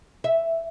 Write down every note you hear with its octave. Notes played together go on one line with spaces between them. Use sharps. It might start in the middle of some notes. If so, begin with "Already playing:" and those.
E5